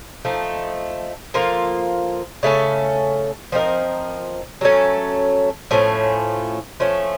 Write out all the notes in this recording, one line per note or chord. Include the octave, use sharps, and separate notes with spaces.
F3 A3 D#4
F3 A#3 F4 A4
C#3 A3 C#4 A4
F3 C4 D#4 A#4
F#3 A3 C#4 A4
A2 F3 A3 C#4
F3 A3 C#4